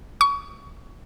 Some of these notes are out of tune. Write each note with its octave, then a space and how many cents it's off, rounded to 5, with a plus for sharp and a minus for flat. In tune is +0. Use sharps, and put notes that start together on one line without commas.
C#6 +25